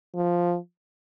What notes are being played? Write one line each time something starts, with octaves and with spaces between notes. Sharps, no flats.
F3